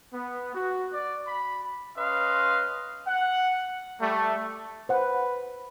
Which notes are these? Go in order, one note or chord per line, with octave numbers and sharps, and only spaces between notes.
B3
F#4
D5
B5
C#4 B4 D#5 F5 C6
F#5
G3 A3
B4 C5 F#5